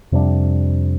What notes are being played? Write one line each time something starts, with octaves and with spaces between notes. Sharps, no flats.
F2 C3 G3 D4